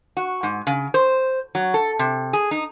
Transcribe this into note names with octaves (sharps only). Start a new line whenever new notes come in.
F#4
G#2
C#3
C5
F#3
A4
C3
G#4
D#4